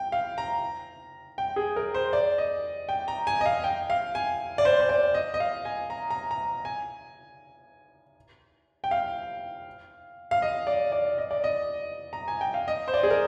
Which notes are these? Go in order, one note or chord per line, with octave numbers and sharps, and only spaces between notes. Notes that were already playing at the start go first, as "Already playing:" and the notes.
Already playing: G5
F5
A#5
G5
G#4
A#4
C5
D5
D#5
G5
A#5
G#5
D#5
F5
G5
F5
G#5
D5
C5
C5
D5
D#5
D#5
F5
G#5
A#5
A#5
A#5
G#5
G5
F5
F5
D#5
D5
D5
D#5
D5
D#5
A#5
G#5
G5
F5
D#5
C5
D5
G#4
A#4